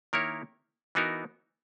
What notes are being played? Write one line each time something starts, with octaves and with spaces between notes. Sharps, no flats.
D#3 A#3 E4 A#4 C#5
E3 B3 D#4 F#4 A#4